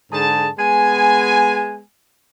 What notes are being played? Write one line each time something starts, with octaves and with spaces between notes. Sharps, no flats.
G#2 D3 G#4 A5
G#3 B3 G#5